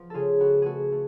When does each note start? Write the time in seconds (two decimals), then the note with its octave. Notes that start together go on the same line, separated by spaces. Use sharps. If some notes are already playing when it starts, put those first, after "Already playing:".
Already playing: F3 B3
0.10 C#3 F4 G#4 A4
0.40 B3 F#4
0.62 A3 F#4 G#4
0.92 A3